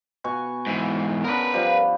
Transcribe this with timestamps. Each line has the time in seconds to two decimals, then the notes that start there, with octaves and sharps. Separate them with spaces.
0.24 B2 G#5 C#6
0.67 G#2 E3
1.24 B3 C#4 D4 A#4 B4
1.53 F3 G3